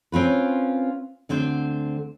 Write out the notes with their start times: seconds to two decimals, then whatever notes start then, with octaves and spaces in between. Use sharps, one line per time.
0.12 C4 C#4 F4 B4
1.29 D2 D3 C4 C5